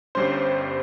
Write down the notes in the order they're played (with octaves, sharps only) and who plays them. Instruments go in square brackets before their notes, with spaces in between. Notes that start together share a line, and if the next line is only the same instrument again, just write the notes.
[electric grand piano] G1 G2 G3 C#4 C5 C6